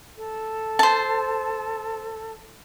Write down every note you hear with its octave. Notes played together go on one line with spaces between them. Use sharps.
A4
C5 A5